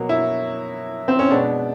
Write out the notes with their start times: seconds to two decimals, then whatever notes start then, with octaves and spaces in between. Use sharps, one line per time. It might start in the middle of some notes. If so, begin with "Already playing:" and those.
Already playing: B2 F#3 A#3
0.09 E4
1.08 C4
1.19 C#4
1.31 B2 G#3 B3 D4